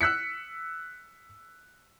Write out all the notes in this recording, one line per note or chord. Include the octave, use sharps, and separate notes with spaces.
E6 F#6 B6 C#7